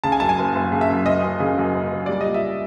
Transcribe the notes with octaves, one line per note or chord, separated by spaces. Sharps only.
C#3 A5
G#5
F#2 A5
G#5
F#1
F#1
C#3
E5
F#2
F#1 D#5
F#1
C#3
F#2
F#1
F#1
G3 D5
A#2 D#5
E5